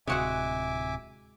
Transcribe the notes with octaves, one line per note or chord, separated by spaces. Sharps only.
D1 C3 G#3 F#4 E5 F#5 G#5 D6